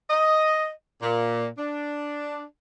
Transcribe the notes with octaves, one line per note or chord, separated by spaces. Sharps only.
D#5
A#2
D4